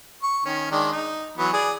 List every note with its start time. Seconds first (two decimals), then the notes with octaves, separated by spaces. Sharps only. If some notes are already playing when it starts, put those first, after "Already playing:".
0.23 C#6
0.46 D#3 C#4
0.71 D#3 G#3 D4
0.93 D#4
1.38 E3 F#3 B3
1.53 G#4 D5